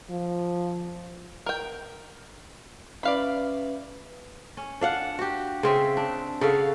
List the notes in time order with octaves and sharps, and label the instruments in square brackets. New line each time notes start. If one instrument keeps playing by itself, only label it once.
[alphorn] F3
[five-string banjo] A#4 G5
[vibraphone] C#4 B4 E5 [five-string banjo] D5 F5 B5
[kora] C#4
D4 F5 F#5
F#4 G4
C#3 C4 E5
D4
C#3 A4 F5 F#5